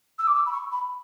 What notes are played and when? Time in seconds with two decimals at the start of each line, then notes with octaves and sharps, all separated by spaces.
0.18 E6
0.27 D6
0.34 E6
0.46 B5
0.52 C#6
0.71 B5